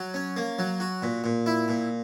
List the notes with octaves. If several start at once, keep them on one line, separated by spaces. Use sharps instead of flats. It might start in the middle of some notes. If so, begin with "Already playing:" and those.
Already playing: F#3
C#4
A#3
F#3
F#4
A#2
A#2
E4
A#2